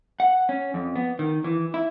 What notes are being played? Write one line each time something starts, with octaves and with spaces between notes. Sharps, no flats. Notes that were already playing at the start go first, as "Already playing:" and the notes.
F#5
C#4
F2
B3
D#3
E3
E4